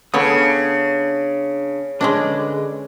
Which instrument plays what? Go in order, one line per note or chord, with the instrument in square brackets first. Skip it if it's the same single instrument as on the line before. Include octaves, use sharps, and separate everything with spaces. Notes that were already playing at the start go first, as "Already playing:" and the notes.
[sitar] C#3 [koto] B3 A4 C#5 [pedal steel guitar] D4 D#6
[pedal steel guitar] D3 B4 D#5 [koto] G#3 C#4 D4